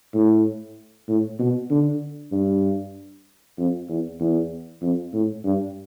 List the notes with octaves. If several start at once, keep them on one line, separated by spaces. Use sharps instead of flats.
A2
A2
B2
D3
G2
F2
E2
E2
F2
A2
G2